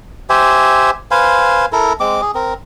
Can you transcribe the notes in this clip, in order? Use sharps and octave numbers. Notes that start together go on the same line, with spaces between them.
G4 C5 E5 G#5
B4 C5 F5 G#5
E4 A4 A#4
G#3 C4 D6
G#4
C4 A#4